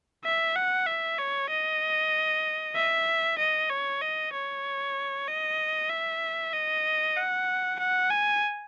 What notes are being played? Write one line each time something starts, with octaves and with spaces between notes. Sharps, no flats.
E5
F#5
E5
C#5
D#5
E5
D#5
C#5
D#5
C#5
D#5
E5
D#5
F#5
F#5
G#5